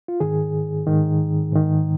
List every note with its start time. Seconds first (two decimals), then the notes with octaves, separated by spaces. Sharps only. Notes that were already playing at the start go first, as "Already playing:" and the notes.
0.08 F4
0.20 G#2 D#3 G#4
0.87 G#2 D#3
1.53 G#2 D#3